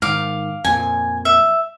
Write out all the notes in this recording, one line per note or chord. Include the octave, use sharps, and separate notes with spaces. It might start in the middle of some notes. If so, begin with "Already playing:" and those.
G#2 D#3 F5 D6
F2 A#2 G#5
E5